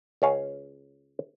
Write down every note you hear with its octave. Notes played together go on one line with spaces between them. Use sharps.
C#2 C#4 F5